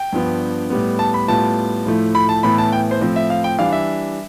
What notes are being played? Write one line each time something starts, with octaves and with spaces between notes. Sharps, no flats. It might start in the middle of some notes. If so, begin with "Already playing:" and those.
Already playing: G5
G2 F3 B3 D4
A2 G3 B3
A5
B5
A2 G3 B3 F4 A5
A2 F3 A3 E4
B5
A5
A2 E3 B3 E4 B5
A5
G5
C5
A2 F3 C4
E5
F5
G5
E3 G3 D4 F5
E5